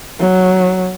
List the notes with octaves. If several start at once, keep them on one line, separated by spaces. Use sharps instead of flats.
F#3